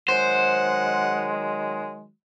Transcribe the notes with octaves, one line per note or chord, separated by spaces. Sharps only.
D#3 F#3 G#3 C5 F#5